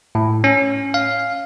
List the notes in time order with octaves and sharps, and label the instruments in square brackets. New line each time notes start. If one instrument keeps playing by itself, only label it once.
[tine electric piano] A2
C#4
F5